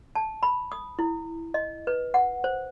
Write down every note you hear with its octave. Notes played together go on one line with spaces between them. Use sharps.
A5
B5
D#6
E4
D#5
B4
F#5
C5